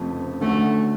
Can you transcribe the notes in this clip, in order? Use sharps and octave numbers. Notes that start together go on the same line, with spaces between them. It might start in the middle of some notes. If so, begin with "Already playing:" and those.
Already playing: F1 F2 C#3 F3 A3
D2 D3 F#3 A3 C#4 F#4